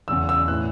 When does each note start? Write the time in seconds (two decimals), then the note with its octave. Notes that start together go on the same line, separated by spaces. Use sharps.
0.08 E1 E2 C#3 E6
0.29 E6
0.48 A2 E3 F#6